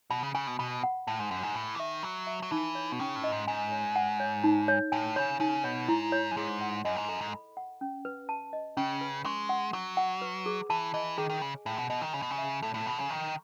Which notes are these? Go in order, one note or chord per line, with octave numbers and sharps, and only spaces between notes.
B2 B5
C#3
C#3 G#5
B2
B2 B5
F#5
A2 A5
G#2
F#2 F#5
G#2
A2 G#5
E3
D#3 E5
F#3 B5
E5
F#3
E3 D#4
C#5
B2
C#3 C#4
A2
D#5
G#2
G#2 G#5
C#5
F#5
C#5
D#4
C#5
A2 G#5
C#3 C#5
C#3 D#4
B2 C#5
G#2 E4
C#5
F#2
G#2 G#4
F#5
F#2 D#5
G#2
F#2 A4
G#2
B5
F#5
C#4
B4
A5
D#5
C#3 C#4
B4
G#3 C#6
F#5
F#3 C#6
F#5
B4
G#4
E3 A5
E3 D#5
D#3 G#4
D#3
C#3 G#5
A2 G#5
B2
B2 D#5
D#3
C#3 B5
B2
C#3
E5
A2 A4
A2
B2 B5
C#3
D#3 C#6